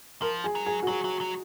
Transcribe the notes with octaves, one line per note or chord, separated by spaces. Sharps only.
F3 A#4
G#4
F#3
G#4
F#4
F#3 G#4
F#3
F#3